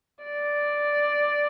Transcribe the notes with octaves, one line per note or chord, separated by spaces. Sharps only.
D5